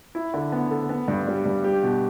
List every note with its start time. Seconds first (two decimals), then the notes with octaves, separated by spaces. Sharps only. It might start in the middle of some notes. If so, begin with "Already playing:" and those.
0.15 E4
0.34 D3
0.52 B3
0.71 A4
0.89 B3
1.08 G2
1.27 G3
1.45 G2
1.64 G4
1.83 B2